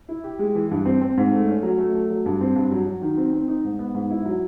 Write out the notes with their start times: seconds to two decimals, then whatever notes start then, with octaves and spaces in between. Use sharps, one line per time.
0.09 E4
0.24 G4
0.39 G#3
0.55 E3
0.71 G2
0.86 C4
1.02 C4
1.17 G#2
1.33 A3
1.48 C#4
1.63 F#3
1.78 A3
1.95 A3
2.10 F#3
2.26 G2
2.41 C4
2.56 G2
2.71 F#3
2.86 F#3
3.02 D#3
3.17 C4
3.33 C4
3.48 D#4
3.65 G#2
3.79 B3
3.94 G#2
4.11 E4
4.25 F#3